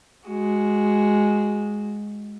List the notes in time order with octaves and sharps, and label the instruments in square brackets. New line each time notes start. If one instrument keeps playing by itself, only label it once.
[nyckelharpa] G#3 F#4